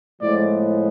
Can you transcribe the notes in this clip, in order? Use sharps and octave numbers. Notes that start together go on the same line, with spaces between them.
A2 F3 G#3 B3 D5